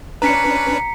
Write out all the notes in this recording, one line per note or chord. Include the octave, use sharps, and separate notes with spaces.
C#4 D4 B4 A#5 B6 C#7